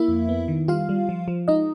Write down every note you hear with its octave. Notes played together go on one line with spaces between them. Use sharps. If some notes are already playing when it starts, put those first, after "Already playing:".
Already playing: A#3 E4 E5
F2
B3
D#3
G3 F4 F5
G3
F3
F3
G#3 D#4 D#5